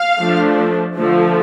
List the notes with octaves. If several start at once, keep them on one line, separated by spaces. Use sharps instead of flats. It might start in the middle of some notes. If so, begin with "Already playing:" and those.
Already playing: F5
F3 A3 D4
D3 F3 A3